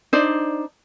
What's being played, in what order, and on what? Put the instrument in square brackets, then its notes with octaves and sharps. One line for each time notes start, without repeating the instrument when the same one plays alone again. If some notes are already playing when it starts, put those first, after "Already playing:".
[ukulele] D4 D#4 C5 D5